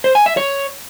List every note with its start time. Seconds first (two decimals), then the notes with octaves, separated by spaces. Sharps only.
0.04 C5
0.15 G#5
0.26 E5
0.37 C#5